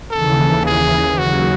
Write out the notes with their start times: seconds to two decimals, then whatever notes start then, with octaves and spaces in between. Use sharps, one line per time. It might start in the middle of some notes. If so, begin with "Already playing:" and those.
0.11 D#2 C#3 E3 A4
0.65 G#4
1.18 D#2 C#3 F#3 F#4